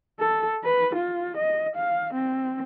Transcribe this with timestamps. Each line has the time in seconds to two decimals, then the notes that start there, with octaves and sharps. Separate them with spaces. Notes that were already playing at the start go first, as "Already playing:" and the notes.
0.20 A4
0.64 B4
0.95 F4
1.37 D#5
1.76 F5
2.13 C4